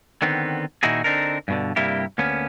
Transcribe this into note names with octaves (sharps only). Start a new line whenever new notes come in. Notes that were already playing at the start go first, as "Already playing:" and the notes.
D3 D#3 B3 C4
A#2 D#3 D#4 E4 F#4 G#4
D3 C4 D4 D#4 A#4
G2 B2 D3
G2 C3 G3 A#3 E4 G4
D2 A#3 B3 C#4